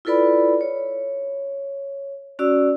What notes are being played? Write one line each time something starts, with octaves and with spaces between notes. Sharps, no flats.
E4 F4 A4 B4 D5 B5
C#5
C#4 F#4 D5 E6